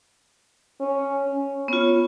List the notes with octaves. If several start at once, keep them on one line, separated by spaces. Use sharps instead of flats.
C#4
C#4
B3 F4 C#5